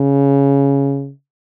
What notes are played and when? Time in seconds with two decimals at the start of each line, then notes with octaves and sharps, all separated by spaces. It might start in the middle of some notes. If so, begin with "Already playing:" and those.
Already playing: C#3